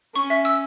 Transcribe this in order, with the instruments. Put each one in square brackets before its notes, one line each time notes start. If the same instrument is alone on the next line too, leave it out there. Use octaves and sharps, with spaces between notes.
[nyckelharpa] C#4 [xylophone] C#6
[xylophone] E5
E6